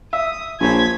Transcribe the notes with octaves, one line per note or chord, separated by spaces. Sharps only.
E5 D#6
A#1 C5 C#5 G#5 G#6 B6